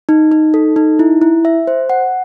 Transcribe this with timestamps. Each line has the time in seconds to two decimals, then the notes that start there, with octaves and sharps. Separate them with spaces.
0.09 D#4
0.32 D#4
0.54 A4
0.76 D#4
0.99 E4
1.21 E4
1.45 E5
1.67 C5
1.90 F#5